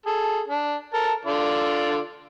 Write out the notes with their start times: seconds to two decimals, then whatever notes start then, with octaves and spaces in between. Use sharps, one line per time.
0.06 G#4 A4
0.48 D4
0.94 A4 A#4 A5
1.25 D3 F4 D5